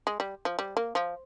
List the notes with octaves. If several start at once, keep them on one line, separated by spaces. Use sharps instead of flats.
G#3
G3
F3
G3
A#3
F3